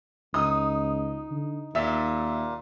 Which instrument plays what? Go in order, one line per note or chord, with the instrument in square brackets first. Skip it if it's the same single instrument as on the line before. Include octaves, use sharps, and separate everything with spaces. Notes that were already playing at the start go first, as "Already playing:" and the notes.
[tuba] C#2 [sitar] D#4 [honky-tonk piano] D#6
[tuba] D3
[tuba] D#2 [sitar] A#2 [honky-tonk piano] E5